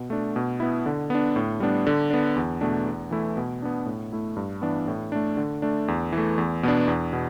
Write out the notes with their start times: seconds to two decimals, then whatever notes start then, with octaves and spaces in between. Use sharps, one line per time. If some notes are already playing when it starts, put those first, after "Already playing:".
Already playing: B2
0.10 A3 D4
0.36 B2
0.60 B3 E4
0.86 D3
1.10 B3 D4
1.36 A2
1.60 G3 B3 D4
1.87 D3
2.10 B3 D4
2.36 E2
2.61 B2 A3 D4
2.86 E2
3.11 E3 A3 E4
3.37 B2
3.62 B3 D4
3.86 A2
4.13 A3 E4
4.36 G2
4.62 E3 B3 D4
4.88 A2
5.12 A3 D4
5.37 D3
5.62 A3 D4
5.88 E2
6.12 E3
6.18 A3
6.38 E2
6.63 B2 B3 D4
6.88 E2
7.13 B2